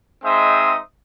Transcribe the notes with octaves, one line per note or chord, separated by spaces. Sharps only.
G#3 C4 D#4 C5 E5 D#6